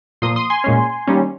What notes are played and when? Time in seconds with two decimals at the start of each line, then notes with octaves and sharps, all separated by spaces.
0.22 A#2 F3 A#3 C6 D#6
0.36 C6 D#6
0.50 G#5 C6
0.64 A#2 G#3 C#4
1.07 D#3 G3 A#3 C#4